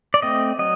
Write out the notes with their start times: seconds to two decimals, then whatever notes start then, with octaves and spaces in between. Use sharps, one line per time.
0.14 D5
0.22 A3 C4 D#5
0.59 F#3 D#5